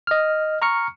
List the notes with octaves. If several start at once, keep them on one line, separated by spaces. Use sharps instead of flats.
D#5 F6
A#5 C#6 F6 C#7